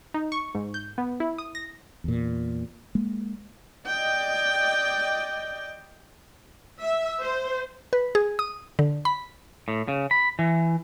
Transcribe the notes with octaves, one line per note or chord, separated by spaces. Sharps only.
D#4
C#6
G#2
G6
B3
E4
D#6
A#6
E2 A#2
G#3 A#3
D5 D#5 G5
E5
C5
B4
G#4
D#6
D3
B5
A2
C#3
B5
E3